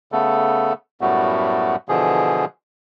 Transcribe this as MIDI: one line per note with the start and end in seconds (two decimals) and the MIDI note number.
0.12 0.73 49
0.12 0.73 57
0.12 0.73 59
0.12 0.73 69
1.01 1.76 42
1.01 1.76 45
1.01 1.76 55
1.01 1.76 57
1.01 1.76 59
1.01 1.76 66
1.89 2.45 47
1.89 2.45 50
1.89 2.45 52
1.89 2.45 53
1.89 2.45 68